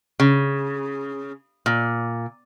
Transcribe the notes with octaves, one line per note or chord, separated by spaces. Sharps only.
C#3
A#2